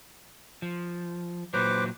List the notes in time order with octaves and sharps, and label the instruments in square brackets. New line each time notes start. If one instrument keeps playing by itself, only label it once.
[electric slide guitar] F3
[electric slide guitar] A#2 F#3 [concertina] B4 C5 D6